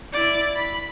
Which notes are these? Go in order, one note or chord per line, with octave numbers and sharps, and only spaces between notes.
E4 D5
B5